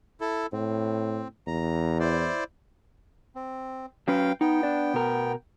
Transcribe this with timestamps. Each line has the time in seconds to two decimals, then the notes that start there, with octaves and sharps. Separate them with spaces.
0.21 E4 A4
0.53 A2 C4
1.47 E2 A#5
2.00 E4 C5 D5
3.35 C4
4.08 F#3 C#4 B4 F5 G5
4.41 B3 D#4 G5
4.63 D4 D5
4.94 B2 A#4